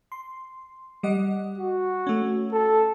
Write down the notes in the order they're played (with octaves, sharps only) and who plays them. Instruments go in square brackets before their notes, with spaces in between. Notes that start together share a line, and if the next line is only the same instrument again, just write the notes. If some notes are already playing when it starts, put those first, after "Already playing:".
[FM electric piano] C6
G3 D#5 F#5
[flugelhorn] F#4
[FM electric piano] A3 C#4
[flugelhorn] A4